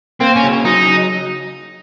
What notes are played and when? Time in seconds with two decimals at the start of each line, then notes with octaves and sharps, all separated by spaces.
0.21 A#3 C4
0.36 C#4
0.43 C#3
0.65 F#3 D#4